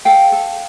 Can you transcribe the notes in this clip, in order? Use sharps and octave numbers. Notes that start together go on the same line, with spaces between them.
A4 F5 G5
A4